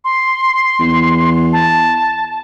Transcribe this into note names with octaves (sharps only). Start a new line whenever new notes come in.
C6
E2
A5